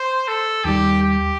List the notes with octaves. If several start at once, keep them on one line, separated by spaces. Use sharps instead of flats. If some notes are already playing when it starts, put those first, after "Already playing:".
Already playing: C5
A4
D#2 D#3 G3 G4
G4